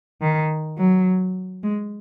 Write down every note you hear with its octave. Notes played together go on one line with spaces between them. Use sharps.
D#3
F#3
G#3